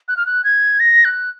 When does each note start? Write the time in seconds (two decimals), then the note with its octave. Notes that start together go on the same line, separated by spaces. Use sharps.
0.08 F#6
0.17 F6
0.26 F#6
0.44 G#6
0.80 A#6
1.05 F#6